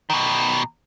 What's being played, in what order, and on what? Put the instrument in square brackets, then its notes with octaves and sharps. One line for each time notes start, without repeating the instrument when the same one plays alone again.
[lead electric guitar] B2 D#3